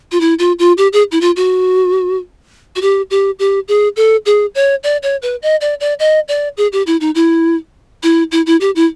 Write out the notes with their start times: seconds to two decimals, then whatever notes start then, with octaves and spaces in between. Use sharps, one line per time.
0.12 F4
0.21 E4
0.39 F4
0.59 F4
0.78 G4
0.93 G#4
1.12 E4
1.21 F4
1.36 F#4
2.76 F#4
2.82 G4
3.11 G4
3.39 G4
3.68 G#4
3.96 A4
4.26 G#4
4.55 C#5
4.84 D5
5.03 C#5
5.22 B4
5.42 D#5
5.61 D5
5.80 D5
5.99 D#5
6.28 D5
6.57 G#4
6.72 G4
6.87 E4
7.01 D#4
7.15 E4
8.03 E4
8.32 E4
8.46 E4
8.61 G4
8.76 E4